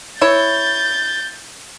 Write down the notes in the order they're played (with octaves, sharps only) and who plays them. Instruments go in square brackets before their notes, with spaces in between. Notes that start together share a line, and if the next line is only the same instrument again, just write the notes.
[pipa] E4 C#5 [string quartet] G6 A6